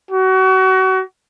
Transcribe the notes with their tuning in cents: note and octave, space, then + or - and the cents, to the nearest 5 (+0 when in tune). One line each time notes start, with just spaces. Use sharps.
F#4 +30